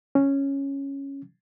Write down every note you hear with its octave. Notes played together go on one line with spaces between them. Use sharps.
C#4